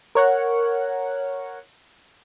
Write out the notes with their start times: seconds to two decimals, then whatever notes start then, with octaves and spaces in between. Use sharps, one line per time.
0.15 A#4 C#5 F#5